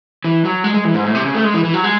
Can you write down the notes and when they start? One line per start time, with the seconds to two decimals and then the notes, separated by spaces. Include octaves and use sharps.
0.24 E3
0.45 F#3
0.64 G#3
0.74 G#3
0.85 E3
0.94 G#2
1.04 A2
1.14 C3
1.24 C#3
1.34 A3
1.44 G#3
1.54 E3
1.64 E3
1.74 F#3
1.84 G#3